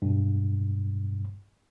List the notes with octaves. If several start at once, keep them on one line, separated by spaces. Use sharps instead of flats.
G2 B2